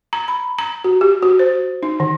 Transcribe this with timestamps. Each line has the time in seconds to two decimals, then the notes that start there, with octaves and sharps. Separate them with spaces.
0.13 A#5
0.28 B5
0.59 A#5
0.84 F#4
1.01 G4
1.23 F#4
1.39 C5
1.83 D#4
2.00 D#3